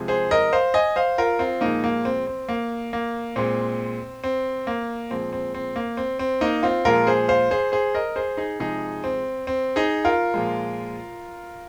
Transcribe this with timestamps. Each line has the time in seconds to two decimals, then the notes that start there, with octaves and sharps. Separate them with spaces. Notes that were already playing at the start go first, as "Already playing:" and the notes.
Already playing: C3 F3 G#3
0.08 G#4 C5
0.31 A#4 D#5
0.53 C5 F5
0.74 D#5 G#5
0.96 C5 F5
1.18 F4 A#4
1.39 C4 F4
1.61 A#2 F3 G#3 A#3 D#4
1.84 A#3
2.05 C4
2.27 C4
2.49 A#3
2.93 A#3
3.36 A#2 G#3 C4
4.24 C4
4.67 A#3
5.10 A#2 F3 G#3 C4
5.33 C4
5.55 C4
5.76 A#3
5.97 C4
6.19 C4
6.41 A#3 D#4
6.63 C4 F4
6.85 A#2 F3 G#3 F4 A#4
7.07 G#4 C5
7.28 C5 F5
7.51 G#4 C5
7.72 G#4 C5
7.95 A#4 D#5
8.16 G#4 C5
8.37 D#4 G#4
8.59 C3 F3 G#3 D#4 G#4
9.04 C4
9.47 C4
9.76 D#4 G#4
10.05 F4 A#4
10.34 A#2 F3 G#3